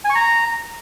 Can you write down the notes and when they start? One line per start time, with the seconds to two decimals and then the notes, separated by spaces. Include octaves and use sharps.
0.05 G#5
0.10 C#6
0.15 A#5